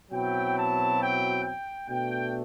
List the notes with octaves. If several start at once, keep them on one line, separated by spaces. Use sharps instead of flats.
B2 F#3 C4 E4 G5
A5
G5
G5
B2 A3 D4 G5